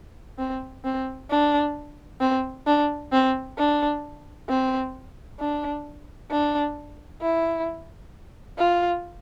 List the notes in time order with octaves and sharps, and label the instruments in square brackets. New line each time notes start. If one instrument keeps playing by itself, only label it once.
[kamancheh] C4
C4
D4
C4
D4
C4
D4
C4
D4
D4
E4
F4